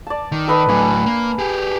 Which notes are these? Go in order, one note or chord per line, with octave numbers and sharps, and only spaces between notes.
D5 A5
D#3
A4 B4 D#5
A2 F#3 D4 G#5
A#3
G4 G#4